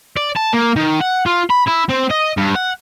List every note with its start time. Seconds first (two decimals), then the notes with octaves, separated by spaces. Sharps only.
0.17 D5
0.36 A5
0.53 A#3
0.76 D#3
1.01 F#5
1.26 F4
1.50 B5
1.67 E4
1.89 C4
2.10 D#5
2.37 G2
2.55 F#5